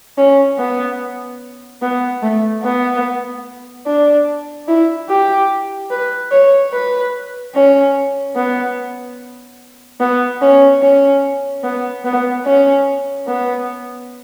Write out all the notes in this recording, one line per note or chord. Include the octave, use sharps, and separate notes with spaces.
C#4
B3
B3
A3
B3
D4
E4
G4
B4
C#5
B4
C#4
B3
B3
C#4
C#4
B3
B3
C#4
B3